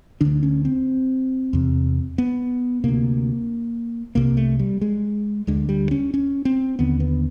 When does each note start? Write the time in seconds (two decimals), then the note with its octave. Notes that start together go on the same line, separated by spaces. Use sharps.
0.21 D2 D3 D4
0.43 C#4
0.65 C4
1.53 E2 C3
2.18 B3
2.84 D2 C3 A#3
4.15 C2 C3 A#3
4.37 A3
4.59 G3
4.81 G#3
5.47 D2 D3 G#3
5.69 G3
5.91 C#4
6.14 C#4
6.45 C4
6.79 D#2 D3 B3
7.00 B3